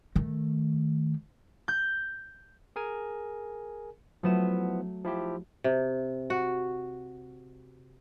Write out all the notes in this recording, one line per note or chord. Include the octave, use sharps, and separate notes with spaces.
D#3 A3
G6
G#4 A#4 G#5
F3 F#3 A3 B3 E4 E7
F3 E4 G4
C3
F#4